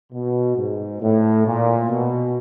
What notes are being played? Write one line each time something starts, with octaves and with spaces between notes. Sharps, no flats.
B2
G#2
A2
A#2
B2